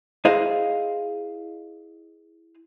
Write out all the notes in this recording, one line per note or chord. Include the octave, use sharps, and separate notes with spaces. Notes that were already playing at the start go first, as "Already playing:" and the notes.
E4 G#4 C5 D#5 F5